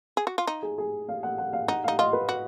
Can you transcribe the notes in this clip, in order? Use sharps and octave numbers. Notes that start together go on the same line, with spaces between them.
G#4
F#4
F4
D#4
G#4
G#4
F5
F#5
F#5
F5
D#4 F#5
D#4 F5
F4 D#5
B4
F#4